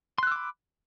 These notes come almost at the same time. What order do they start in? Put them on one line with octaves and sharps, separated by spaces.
C6 F#6 E6 D6 B5